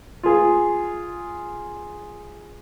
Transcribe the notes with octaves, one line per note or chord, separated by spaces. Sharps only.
F4 G#4